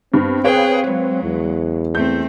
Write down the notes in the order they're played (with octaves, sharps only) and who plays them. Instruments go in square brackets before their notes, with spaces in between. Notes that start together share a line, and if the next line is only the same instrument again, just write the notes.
[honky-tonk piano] G2 [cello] B3 [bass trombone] C4
[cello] G#4 G5 [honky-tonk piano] B4 C#5 F5
[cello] F#3 G#3
[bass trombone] E2
[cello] A3 C4 [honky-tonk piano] G6